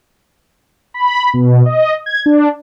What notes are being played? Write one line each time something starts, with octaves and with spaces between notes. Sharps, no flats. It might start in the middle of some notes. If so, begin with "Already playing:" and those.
B5
B2
D#5
G#6
D4